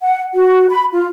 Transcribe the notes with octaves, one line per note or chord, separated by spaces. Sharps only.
F#5
F#4
B5
F4